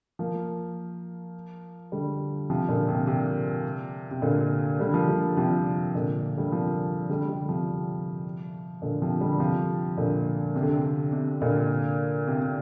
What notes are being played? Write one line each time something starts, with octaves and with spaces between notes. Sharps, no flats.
F3 A#3
D3 G3
C3 F3
A#2 D3
C3
C3
C3
A#2 D3
D3 G3
F3 A#3
D3 G3
C3 F3
A#2 D3
D3 G3
C3 F3
D3 G3
D3 G3
C3 F3
A#2 D3
C3 F3
D3 G3
C3 F3
A#2 D3
C3
D3
C3
C3
A#2 D3
C3
C3